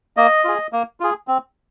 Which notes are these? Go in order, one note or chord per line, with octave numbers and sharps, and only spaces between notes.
A#3 D#5
F4 G#4
A#3
F4 G#4
C4